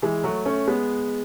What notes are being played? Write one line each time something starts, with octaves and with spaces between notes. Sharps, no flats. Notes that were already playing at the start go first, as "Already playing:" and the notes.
E3 G#3
F#3 A3
A3 C#4
G#3 B3